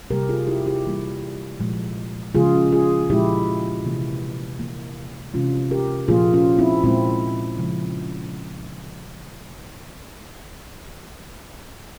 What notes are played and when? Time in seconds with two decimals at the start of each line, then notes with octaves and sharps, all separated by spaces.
0.10 C3 G3 A#3 G4 A#4
0.29 F4 G#4
0.48 E4 G4
0.66 E4 G4
0.86 E3 G3 A#3
1.60 A#2 F3 G#3
2.35 C#3 F3 G#3 F4 G#4
2.72 F4 G#4
3.10 A#2 F3 G#3 E4 G4
3.85 C3 E3 A#3
4.59 E3 A#3
5.34 C3 E3 G#3 C#4 F4
5.71 G4 A#4
6.08 A#2 F3 A#3 F4 G#4
6.34 C#4 F4
6.59 C4 E4
6.84 A#2 G#3 C4 E4
7.59 C#3 F3 G#3